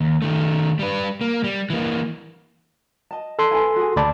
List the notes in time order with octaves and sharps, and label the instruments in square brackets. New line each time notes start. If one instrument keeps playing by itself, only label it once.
[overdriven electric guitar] D#2
D#3 A3
G3 B4
A#3
G3
E3 A#3
[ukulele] D#5 A5
[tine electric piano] A4 C6
[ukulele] E4 B4 G#5
F#4 G#4
[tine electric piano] D2 D5 A5 [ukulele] B5